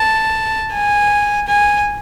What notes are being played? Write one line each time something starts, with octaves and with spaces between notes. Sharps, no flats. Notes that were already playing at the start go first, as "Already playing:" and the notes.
Already playing: A5
G#5
G#5